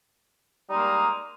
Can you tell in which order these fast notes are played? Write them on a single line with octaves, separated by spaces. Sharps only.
G3 D#4 G#3 A#3